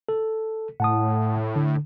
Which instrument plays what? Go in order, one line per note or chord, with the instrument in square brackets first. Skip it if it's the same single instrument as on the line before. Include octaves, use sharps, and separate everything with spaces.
[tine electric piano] A4
[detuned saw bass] A2 [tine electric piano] F#5 A5 D#6
[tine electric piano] D3